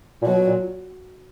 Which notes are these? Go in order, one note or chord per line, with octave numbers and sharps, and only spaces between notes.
A#2
B2 F#3
A#2